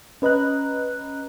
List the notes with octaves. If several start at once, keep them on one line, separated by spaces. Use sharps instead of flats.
C#4 B4 D#5 A#5 F#6